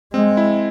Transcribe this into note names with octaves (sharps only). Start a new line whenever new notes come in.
G#3 C4
E4